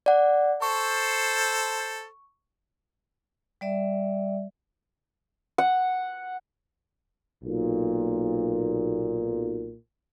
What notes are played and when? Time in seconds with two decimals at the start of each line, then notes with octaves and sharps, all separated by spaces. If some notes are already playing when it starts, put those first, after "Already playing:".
0.06 D5 F#5
0.62 A4 C5 C#6
3.61 G3 D5 E5
5.58 F#5
7.44 B1 A#2